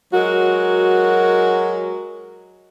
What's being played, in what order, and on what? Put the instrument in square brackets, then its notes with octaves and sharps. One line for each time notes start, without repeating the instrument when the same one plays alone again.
[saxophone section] F#3 G#3 F#4 A#4